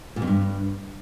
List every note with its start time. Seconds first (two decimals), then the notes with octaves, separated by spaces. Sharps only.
0.16 A#2
0.22 F2
0.27 G2